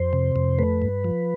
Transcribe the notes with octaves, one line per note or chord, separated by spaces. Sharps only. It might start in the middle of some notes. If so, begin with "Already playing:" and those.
Already playing: F2 C5
C3
F2
A3 B4
G2
F3